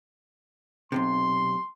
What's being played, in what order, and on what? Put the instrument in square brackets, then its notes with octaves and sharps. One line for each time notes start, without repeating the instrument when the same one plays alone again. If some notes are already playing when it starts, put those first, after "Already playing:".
[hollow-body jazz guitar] B1 G2 C3 [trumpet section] C6